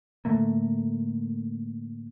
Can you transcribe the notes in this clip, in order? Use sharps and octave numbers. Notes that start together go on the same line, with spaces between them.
A2 D3 A3 A#3